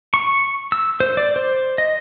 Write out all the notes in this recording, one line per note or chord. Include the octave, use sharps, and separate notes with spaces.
C#6
E6
C5
D5
C5
D#5